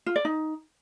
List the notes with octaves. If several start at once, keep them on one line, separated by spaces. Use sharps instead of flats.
F4
D5
D#4